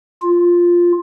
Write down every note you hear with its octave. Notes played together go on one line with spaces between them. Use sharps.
F4